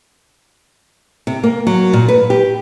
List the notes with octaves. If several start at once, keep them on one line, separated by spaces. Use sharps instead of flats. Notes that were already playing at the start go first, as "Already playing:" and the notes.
C3
A#3
F#3
A#2
B4
G4